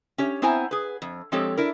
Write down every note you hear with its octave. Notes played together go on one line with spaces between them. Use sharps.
C#4 G4 C#5
B3 C4 E4 C5 G#5 A#5
G#4 B4
F2
F3 G#3 C4 G4 A4 C#5
D4 E4 A#4